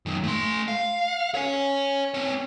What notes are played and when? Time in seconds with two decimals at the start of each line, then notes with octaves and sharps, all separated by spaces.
0.06 F#2 D#3
0.24 A3 C6
0.68 F5
1.35 C#5 G#5
2.14 C4 C#5